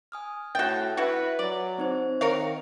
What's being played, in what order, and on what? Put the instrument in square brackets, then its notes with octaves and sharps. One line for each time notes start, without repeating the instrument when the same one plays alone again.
[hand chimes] G#5 D#6 F6
[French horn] A2 [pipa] F#4 G5 [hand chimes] E5 A6
[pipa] E4 F#4 [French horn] B4
[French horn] F#3 [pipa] D5
[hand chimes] C4 D#4 C5
[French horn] D#3 [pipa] A#4 C#5 F5